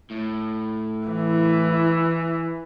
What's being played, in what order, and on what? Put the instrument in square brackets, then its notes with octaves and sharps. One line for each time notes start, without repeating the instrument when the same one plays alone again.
[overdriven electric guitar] A2
[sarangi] E3 [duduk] E4